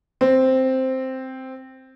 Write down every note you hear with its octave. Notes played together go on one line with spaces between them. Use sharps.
C4